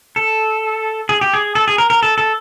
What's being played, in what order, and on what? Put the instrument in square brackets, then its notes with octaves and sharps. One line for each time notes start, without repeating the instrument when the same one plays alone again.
[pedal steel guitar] A4
G#4
G4
G#4
A4
G#4
A#4
A#4
A4
A4